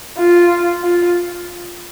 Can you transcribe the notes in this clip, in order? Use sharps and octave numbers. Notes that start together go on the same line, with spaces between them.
F4
F4